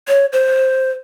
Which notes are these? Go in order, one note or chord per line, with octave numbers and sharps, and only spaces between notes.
C#5
C5